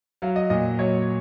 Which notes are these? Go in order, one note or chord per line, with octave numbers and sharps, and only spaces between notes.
F#3 F5
D#5
A#2 D#5
F#3 C#5